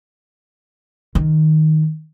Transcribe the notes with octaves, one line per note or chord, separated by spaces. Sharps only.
D#3